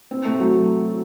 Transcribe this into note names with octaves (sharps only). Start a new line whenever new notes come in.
C4
A3
F#3